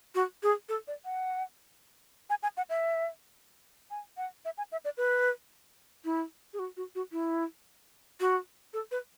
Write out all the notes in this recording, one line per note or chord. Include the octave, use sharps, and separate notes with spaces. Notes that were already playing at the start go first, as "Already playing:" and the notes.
F#4
G#4
A4
D5
F#5
G#5
G#5
F#5
E5
G#5
F#5
E5
G#5
E5
D5
B4
E4
G#4
F#4
F#4
F#4
E4
F#4
A4
B4